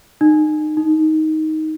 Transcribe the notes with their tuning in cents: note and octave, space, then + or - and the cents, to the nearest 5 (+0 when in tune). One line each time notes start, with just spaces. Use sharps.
D#4 -30
D#4 +10